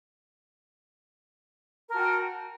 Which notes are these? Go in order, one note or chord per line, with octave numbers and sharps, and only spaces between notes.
F#4 A#4 G5 A5